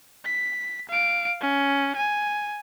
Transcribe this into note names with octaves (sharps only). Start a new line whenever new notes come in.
B6
F5 D7
C#4
G#5